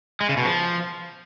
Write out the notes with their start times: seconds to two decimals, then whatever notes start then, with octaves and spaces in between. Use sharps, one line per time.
0.21 G#3
0.29 C#3
0.37 B2
0.45 F3